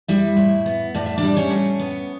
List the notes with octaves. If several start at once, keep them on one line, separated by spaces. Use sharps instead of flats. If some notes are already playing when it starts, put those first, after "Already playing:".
G3 E4 E5
A2
B3
A2 D5
E5
G3 D4 D5
C#4 C#5
A2
B3